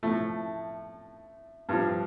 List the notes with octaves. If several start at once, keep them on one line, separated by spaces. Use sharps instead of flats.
A2 F3 A3
G2 F3